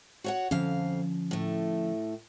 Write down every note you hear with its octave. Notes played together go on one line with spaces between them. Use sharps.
F#4 C#5 F#5
F2 D3 F3 C#4 F5
A2 A3